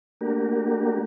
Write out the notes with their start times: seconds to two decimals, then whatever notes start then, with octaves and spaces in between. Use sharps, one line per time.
0.21 A3 A#3 D4 F#4 G4 A#4